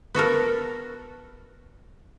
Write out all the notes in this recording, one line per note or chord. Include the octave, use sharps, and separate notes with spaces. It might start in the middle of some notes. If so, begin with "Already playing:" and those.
B3 F#4 A4 A#4